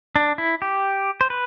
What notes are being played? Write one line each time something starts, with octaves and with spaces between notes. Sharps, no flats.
D4
E4
G4
C5
B4